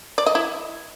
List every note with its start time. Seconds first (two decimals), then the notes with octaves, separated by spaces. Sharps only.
0.18 D5
0.26 D#5
0.35 E4